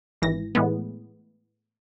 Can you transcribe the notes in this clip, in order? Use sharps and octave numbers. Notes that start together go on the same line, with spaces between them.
G#1 E3 A#6
A2 E3 G#3 B3